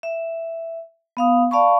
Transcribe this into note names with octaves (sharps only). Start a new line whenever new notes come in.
E5
B3 F5 D#6
D5 F5 A5 B5 C#6